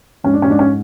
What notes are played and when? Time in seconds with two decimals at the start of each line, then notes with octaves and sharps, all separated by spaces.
0.24 G#2 C#4
0.33 D4
0.42 C#4
0.48 G#2 D4
0.59 C#4